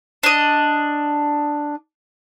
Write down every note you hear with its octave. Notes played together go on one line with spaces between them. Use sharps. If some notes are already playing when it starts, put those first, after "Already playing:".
D4 D#5